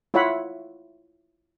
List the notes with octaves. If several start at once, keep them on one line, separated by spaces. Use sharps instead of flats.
E4 F4 C#5 E5 F#5 B5